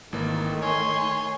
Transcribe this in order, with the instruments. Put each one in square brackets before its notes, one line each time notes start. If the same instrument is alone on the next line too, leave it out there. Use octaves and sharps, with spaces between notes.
[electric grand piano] G#1 E3 A#3 [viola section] D#3 A3 D#4
[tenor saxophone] C#5 [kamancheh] G#5 C6 [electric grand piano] C#6